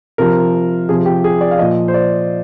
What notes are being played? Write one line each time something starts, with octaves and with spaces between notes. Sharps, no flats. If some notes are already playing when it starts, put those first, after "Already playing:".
C3 F3 A#4
C3 F3 G#4
G4
G#4
D5
F5
A#2 F3 D#5
C5
D5